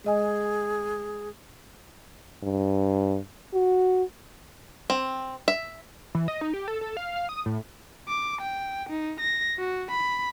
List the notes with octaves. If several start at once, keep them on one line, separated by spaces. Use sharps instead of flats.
G#3 G#4 D#5 G#5
G2
F#4
C4
E5
E3
D#5
D#4
G4
A4
A4
F5
F5
D#6
A2
D6
G5
D#4
A#6
F#4
B5